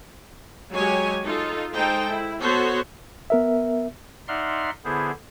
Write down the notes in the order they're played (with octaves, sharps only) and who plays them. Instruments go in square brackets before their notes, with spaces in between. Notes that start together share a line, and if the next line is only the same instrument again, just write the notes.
[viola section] F#3 G#3 G4 C#5 G#5
D#4 F4 A4
G#3 D#4 A4 C5 G5
E4
B3 F#4 A4 C5 C#5
[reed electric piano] B3 A#4 E5
[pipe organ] D#4 D5 E5 F#5 C6 F6
D3 B3 E4 G#4 C5